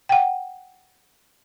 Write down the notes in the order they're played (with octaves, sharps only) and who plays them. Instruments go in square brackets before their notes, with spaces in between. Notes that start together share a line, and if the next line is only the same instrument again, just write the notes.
[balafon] F#5 G5